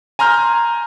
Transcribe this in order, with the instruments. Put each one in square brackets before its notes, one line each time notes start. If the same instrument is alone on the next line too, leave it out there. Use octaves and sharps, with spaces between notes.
[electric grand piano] G#5 A#5 C6 F6 G6